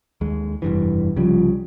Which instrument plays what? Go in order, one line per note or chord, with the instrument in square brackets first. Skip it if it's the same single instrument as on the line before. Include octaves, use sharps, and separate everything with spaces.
[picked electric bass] D#2 G#3
F1 G2 E3
[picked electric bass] C2 C#3 G3 [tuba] F3